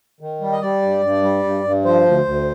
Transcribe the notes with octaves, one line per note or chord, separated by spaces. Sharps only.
D#3
G3
D#5
G3 D5
G2
G2
G3
G2
G2
F3 C5
D2
D2